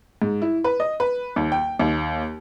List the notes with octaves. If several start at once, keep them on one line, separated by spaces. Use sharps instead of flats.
G#2
E4
B4
D#5
B4
D#2
G5
D#2